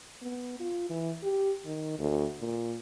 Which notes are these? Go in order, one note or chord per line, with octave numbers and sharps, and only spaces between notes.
B3
F4
E3
G4
D#3
D2
A#2